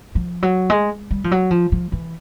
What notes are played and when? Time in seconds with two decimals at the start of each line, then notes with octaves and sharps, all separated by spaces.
0.15 F3
0.42 F#3
0.70 G#3
1.11 G3
1.24 F3
1.31 F#3
1.51 F3
1.72 F3
1.92 E3